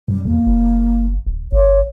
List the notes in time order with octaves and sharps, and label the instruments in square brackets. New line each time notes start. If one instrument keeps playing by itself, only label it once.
[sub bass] F#2 [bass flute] G3
[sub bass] E2 [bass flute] A#3
[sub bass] F#1
D1
[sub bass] G1 [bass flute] C#5